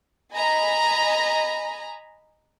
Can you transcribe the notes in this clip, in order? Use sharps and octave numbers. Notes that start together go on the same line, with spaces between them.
D#5 G#5 A#5 B5